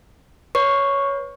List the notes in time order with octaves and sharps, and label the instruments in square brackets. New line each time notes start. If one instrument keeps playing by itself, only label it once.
[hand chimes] B4 C#5 [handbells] C#6